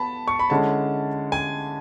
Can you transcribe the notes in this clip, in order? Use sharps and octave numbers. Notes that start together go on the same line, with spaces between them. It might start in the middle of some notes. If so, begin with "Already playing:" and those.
Already playing: B3 A5 B5
C#6
B5
D3 G#3 C#4 E4 A5
G#5